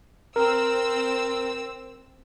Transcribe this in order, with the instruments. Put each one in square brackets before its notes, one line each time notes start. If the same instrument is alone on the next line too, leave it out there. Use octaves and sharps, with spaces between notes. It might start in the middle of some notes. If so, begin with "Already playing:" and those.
[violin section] C4 E6 [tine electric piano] A#4